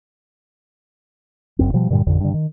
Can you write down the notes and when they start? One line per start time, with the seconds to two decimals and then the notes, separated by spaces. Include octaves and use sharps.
1.59 F#1 F#2 C4
1.74 B2 F3 G3
1.90 G2 A#2 D3 G3
2.07 A1 F2 D3
2.20 G2 D3
2.34 D#3